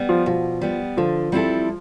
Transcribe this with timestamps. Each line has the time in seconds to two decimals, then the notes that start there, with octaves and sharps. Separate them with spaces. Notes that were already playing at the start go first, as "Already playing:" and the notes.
Already playing: G3 B3
0.09 F3
0.26 B2 F3
0.61 G3 B3
0.97 D3 F3
1.32 G3 C4 E4 A4